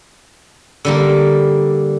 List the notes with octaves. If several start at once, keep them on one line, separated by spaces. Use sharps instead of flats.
D3 G3 A#3